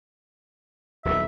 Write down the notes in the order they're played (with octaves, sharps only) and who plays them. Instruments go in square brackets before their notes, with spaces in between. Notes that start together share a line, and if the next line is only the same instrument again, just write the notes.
[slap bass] D#1 B1 G2 [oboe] E5